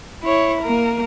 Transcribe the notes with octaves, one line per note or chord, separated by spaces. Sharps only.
E4 C#5
A#3 A#4